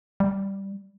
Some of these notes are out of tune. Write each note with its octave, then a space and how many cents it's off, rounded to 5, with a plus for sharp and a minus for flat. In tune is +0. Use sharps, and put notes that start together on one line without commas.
G3 +0